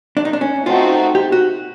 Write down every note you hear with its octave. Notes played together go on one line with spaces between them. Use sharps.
D4
D#4
D4
C#4
A3 C4 D#4 F4 F#4
G4
F#4